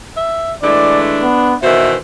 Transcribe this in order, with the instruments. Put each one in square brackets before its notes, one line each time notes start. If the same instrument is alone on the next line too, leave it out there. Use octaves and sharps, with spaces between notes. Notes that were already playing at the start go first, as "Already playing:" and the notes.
[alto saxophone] E5
[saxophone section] E3 G#3 A3 [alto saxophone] D4 [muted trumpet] D5
[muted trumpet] B3
[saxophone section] B2 D#3 E3 [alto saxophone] C5 [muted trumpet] E5